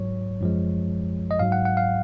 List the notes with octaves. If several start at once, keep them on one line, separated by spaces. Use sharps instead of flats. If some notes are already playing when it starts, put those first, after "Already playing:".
Already playing: G#2 F#3 C#5
F#2 F3 G#3
D#5
G#2 F#3 F5
F#5
F#5
F5